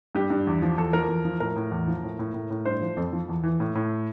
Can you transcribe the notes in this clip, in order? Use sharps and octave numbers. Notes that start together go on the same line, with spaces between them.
G2 G4
G2
E2
F3
E2 A4
F3 A#4
E2
F3
A2 A#4
A2
E2
F3
A2
A2
A2
A2
G2 C5
F3
F2 A4
F3
E2
E3
A2
A2